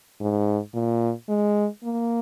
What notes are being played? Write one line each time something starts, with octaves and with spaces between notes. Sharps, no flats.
G#2
A#2
G#3
A#3